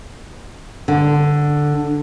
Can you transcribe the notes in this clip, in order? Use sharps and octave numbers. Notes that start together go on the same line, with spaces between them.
D3